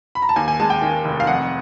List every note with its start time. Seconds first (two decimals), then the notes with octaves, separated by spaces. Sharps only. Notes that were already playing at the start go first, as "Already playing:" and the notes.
0.15 B5
0.22 A#5
0.29 A5
0.36 D#2 G#5
0.48 G#5
0.60 G#3 A5
0.70 G5
0.82 D#3
1.05 F1
1.20 F5
1.27 F2 F#5